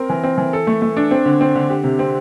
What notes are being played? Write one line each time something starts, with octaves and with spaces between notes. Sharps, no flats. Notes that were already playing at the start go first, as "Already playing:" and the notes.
Already playing: C4 A#4
E3
C4
E3
A4
A3
A3
D4
C4
D3
C4
D3
G4
C3
C4